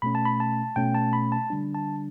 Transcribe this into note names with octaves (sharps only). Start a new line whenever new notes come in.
B2 A3 C#4 B5
A5
B5
A5
B2 A3 C#4 G5
A5
B5
A5
D3 G3 D4
A5